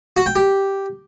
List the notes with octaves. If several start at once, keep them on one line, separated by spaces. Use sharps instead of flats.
F#4
G5
G4